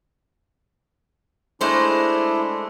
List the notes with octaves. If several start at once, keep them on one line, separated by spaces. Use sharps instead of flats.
G#3 A3 D4 E4 C5